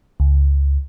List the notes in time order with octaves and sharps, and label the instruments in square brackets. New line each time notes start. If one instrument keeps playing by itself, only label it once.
[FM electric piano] C#2